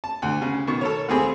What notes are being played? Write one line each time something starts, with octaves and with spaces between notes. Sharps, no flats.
A5
D2 D3
C#3
B2 D#3 C#6
A4 A#4 C#5
D#2 A3 C4 G4 G#4 B5